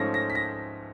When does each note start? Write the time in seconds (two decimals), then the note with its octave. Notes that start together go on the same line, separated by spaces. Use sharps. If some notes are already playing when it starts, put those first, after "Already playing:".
Already playing: G#2 F3 A3 C#4 A#6
0.14 A#6
0.30 B6
0.35 A#6